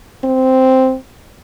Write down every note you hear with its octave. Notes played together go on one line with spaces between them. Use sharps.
C4